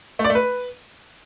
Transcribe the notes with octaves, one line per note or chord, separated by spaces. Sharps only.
A3
D5
A3
B4